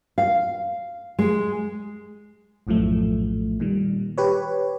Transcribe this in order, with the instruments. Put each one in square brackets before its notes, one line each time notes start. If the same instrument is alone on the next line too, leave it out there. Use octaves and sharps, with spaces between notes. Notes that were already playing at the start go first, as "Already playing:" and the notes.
[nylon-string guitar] F5
G#3
[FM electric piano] A#1 F#2 A2 F3 A3
A#2 D#3 G3
G4 B4 C#5